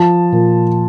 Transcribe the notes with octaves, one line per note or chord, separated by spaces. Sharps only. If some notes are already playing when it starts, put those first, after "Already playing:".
Already playing: F3 A5
A#2